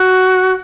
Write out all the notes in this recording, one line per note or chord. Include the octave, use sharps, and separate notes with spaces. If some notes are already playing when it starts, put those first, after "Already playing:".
Already playing: F#4